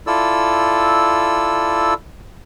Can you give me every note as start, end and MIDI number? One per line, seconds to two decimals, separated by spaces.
0.07 1.94 64
0.07 1.94 65
0.07 1.94 69
0.07 1.94 74
0.07 1.94 88